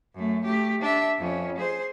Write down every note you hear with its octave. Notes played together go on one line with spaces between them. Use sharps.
F#2 A3
A3 G4
D4 E5
F2 C#4
G#4 C5